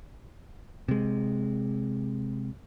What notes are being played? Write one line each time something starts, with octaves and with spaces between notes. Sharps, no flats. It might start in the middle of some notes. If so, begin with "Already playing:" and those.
C3 G#3